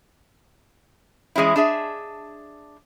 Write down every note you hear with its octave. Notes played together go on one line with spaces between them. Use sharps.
E3 G#3 C#4 E4
D4 G#4 E5